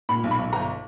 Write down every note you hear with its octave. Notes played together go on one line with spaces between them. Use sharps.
A#2 B5
B1
B5
B1
G1 A#5